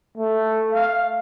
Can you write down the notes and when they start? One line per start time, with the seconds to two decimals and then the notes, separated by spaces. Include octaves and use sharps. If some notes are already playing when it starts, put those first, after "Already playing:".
0.17 A3
0.73 F5